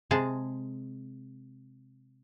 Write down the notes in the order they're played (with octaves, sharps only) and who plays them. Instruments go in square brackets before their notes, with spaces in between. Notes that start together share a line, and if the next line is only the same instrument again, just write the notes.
[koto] C3 G#3 G#4 A5